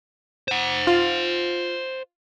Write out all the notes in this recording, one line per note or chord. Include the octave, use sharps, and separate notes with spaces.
C5 F#5
F4